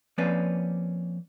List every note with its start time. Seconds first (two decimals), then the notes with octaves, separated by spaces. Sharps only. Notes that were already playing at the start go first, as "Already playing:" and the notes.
0.18 F3 A#3 C4 C#4 B4 D5